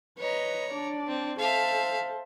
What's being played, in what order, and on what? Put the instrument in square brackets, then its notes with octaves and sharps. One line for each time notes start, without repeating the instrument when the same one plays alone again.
[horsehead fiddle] B4 D#5 [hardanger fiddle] C#5 A#5
[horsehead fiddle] D4 D5
[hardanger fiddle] C4
[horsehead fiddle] A4 C5 [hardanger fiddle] E5 F5